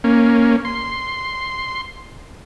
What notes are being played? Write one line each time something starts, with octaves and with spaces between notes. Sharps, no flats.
A#3 C#4
C6